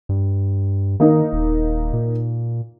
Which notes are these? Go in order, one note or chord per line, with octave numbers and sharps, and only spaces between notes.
G2
D#3 A#3 D#4
D#1
A#2